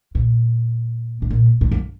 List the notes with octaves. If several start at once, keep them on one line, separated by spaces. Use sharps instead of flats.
A#2
G#2
A#2
G#2
F#2